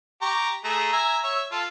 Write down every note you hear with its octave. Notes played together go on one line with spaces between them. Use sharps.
G4 A#5 C#6
A3 G#4 A#5
E5 G#5 A#5
C#5 E5
F4 A4